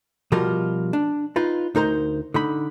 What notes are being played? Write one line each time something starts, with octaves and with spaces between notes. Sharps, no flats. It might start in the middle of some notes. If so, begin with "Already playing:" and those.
B2 F3 G3 F4 F#4 A#4
D4
D#4 F4 B4
D2 D#4 A#4 C5 A#5
D3 D#4 B5